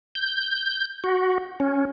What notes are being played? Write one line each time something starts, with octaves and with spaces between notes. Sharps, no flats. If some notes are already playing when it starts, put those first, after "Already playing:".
G6
F#4
C#4